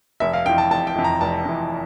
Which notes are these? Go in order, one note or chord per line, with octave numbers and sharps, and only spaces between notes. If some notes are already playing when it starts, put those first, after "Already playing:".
F1 E5
F5
F2 E3 G5
A5
F1 A5
G5
F2 E3
A#5
F1 A5
F2 E3